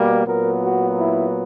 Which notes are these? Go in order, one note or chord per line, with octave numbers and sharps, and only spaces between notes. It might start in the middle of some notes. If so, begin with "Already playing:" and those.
Already playing: B2 G3 A#3
A#2 F#3 B3 A#4
F#4
E4